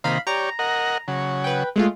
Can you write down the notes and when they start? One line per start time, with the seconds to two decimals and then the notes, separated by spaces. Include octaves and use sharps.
0.04 C3 D#3 A#3 F5 B5
0.27 G4 C#5 D5 A#5
0.59 A#4 D#5 F#5
1.08 C#3 F#3
1.44 B4 G5
1.76 G#3 A3 F4